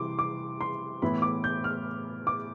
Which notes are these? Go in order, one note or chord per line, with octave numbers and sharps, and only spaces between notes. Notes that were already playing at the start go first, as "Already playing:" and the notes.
Already playing: C3 E3 G3 C6 D6
D6
C6
A2 E3 B3 E4 B5
D6
G6
F6
D6